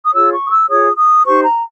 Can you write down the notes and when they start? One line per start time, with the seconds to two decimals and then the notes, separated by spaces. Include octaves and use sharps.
0.05 D#6
0.14 F4 G#4 C#5 E6
0.33 C#6
0.47 D#6
0.51 E6
0.69 F4 G#4 C#5 D#6
0.97 D#6
1.25 D#4 G4 C5 C#6
1.44 A#5